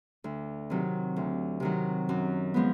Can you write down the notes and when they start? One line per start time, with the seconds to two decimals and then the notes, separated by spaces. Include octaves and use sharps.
0.24 D2
0.70 C3 D#3 F#3
1.16 D2
1.60 C3 D#3 F#3
2.09 F#2
2.54 F3 G#3 B3